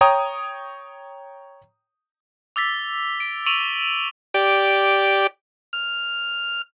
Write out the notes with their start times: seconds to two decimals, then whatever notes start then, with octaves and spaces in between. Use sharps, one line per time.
0.01 C#5 G5 A#5 D#6
2.56 D6 E6 A6 B6
3.20 D7
3.46 C#6 E6 D7 D#7 F7 F#7
4.34 G4 D5
5.73 F6